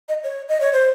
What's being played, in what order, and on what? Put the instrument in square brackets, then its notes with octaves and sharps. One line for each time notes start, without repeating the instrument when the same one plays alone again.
[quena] D#5
C#5
D#5
C#5
C5